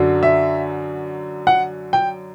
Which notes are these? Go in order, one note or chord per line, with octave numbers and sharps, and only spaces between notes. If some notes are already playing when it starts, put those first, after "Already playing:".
Already playing: F#2 D3 F#3
E5
F#5
G5